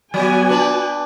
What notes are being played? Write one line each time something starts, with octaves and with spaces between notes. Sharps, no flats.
F#3 B3 F#4 G4 G#5
D4 B4 D5